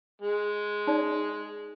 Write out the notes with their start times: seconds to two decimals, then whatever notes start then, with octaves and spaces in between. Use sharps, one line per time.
0.22 G#3
0.87 D#4 D5